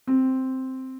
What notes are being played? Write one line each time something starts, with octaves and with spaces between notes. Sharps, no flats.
C4